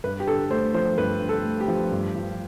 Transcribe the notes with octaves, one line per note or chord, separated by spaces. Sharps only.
G2 B4
G4
D3 A4
A3 C5
F3 C5
G2 B4
D3
A4
A3
G4
F3
G2
F3